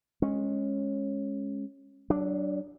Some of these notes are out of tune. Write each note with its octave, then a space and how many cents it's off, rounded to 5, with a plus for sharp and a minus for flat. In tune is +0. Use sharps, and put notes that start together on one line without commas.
G#3 +0 C#4 -15
F#3 +30 D4 +0